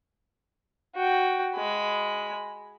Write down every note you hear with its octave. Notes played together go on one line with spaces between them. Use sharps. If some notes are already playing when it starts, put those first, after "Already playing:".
F#4 G5
G#3 B5